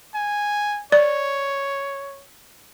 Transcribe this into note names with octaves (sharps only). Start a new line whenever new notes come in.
G#5
C#5 D5